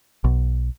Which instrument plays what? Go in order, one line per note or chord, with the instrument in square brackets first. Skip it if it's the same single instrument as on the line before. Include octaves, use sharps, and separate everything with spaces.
[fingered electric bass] B1